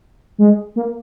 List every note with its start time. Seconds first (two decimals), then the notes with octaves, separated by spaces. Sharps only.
0.38 G#3
0.76 A#3